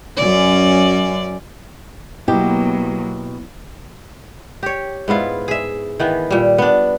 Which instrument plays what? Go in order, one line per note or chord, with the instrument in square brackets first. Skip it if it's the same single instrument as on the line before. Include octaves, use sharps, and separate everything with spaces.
[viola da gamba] F#2 C#4 D5
[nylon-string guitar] B2 G4 [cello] F#3 A#3 [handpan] B3 E4
[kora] G4 C#5
G#2 B3 E4 F4
G#4 E5
D#3 E3 B3
A#2 G3
B3 D4